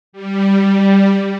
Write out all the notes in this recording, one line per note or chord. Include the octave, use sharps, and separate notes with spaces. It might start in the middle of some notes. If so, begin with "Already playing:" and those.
G3